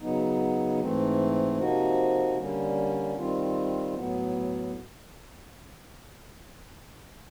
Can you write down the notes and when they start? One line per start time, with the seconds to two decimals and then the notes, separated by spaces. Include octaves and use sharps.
0.01 C#3 F#3 B3 D#4
0.79 G#2 E3 A3 C4
1.58 C3 F3 A#3 D#4 F#4
2.37 D3 G3 A#3 C#4
3.16 D#3 G3 C4 F4
3.94 A2 F#3 B3